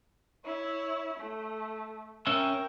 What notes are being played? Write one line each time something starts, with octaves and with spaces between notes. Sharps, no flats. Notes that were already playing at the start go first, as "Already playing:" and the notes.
E4 C#5
A3
C#4 A#4 E5 G5